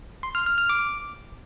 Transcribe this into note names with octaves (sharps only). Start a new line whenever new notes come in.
C6
F6
F6
F6
D6